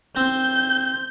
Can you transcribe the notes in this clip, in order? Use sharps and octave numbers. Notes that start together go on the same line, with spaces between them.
C4 G6